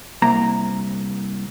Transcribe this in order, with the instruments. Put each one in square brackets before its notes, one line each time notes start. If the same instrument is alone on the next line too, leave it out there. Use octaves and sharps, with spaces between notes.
[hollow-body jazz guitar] C2 A#3 A#5